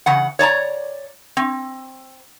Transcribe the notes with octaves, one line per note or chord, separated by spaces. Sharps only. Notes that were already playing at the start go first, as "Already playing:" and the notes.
C#3 E3 F#5
C#5 D5 A5 A#5
C4